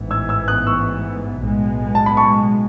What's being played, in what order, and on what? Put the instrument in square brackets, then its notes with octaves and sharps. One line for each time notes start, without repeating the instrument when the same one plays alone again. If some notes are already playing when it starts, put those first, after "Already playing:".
Already playing: [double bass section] A1 G#2 E3 B3
[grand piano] E6 G#6
E6 G#6
D#6 F#6
C#6 E6
[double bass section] B1 A2 G#3 B3
[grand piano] A5
B5
A5 C#6